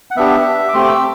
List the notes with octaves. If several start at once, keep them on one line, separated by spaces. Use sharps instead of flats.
F#5
B3 D4 G4 E5
D6
A3 C4 G4 C6
D6
E6